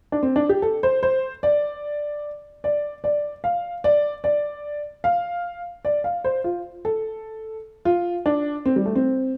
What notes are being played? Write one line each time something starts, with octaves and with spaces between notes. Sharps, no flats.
D4
C4
D4
G4
A4
C5
C5
D5
D5
D5
F5
D5
D5
F5
D5
F5
C5
F4
A4
F4
D4
C4
G3
A3
C4